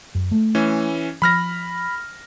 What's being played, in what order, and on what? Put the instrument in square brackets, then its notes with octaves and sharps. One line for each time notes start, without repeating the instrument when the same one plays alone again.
[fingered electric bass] F#2
A3
[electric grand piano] E3 C#4
[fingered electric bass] F3 [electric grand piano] B5 F6 A#6